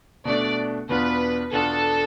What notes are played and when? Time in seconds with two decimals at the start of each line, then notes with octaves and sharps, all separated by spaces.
0.25 B2 A3 D4 D5
0.89 E2 B2 B3 D4 F4 B4
1.52 E2 B2 B3 D4 F4 A4